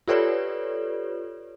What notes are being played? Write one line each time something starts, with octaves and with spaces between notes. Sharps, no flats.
F4 G4 A4 B4 C#5 D5